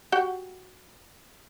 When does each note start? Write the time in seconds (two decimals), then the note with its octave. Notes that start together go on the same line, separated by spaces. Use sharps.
0.12 F#4 G4 F#5